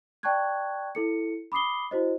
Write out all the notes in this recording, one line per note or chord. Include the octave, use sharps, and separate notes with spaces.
D5 G5 A5 C#6 F#6 G#6
E4 A4 C#7
B5 D6 D#6 C7 G7
E4 F#4 C5 D#5